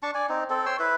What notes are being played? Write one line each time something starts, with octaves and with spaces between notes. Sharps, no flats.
D4 A5 C#6
D5 G#5
C4 D#4
C4 A4
C#5 G5 C6 E6
E4 B4